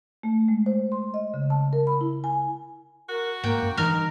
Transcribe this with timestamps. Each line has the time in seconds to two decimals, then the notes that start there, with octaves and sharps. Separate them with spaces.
0.23 A3
0.48 G#3
0.66 C5
0.92 C6
1.14 D#5
1.34 C#3
1.50 A5
1.73 A#4
1.87 B5
2.01 E4
2.24 G#5
3.09 F#4 A#4
3.44 G#2 A#3 G5
3.62 F#2
3.77 D3 E3 G3 D#4 A#4 F6